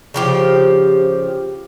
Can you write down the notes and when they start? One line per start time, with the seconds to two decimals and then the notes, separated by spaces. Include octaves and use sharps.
0.14 C#3 F3 G4